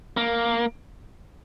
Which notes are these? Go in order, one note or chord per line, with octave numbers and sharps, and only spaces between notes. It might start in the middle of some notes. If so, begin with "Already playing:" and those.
A#3